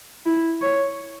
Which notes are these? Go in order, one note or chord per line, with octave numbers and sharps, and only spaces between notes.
E4
C#5